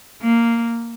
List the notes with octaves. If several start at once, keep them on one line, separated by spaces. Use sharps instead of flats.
A#3